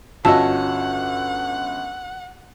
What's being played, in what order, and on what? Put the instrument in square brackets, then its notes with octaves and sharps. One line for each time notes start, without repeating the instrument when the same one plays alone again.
[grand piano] G1 C#4 E6 [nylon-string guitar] F4 F#4 D#5 [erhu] F#5 [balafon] A5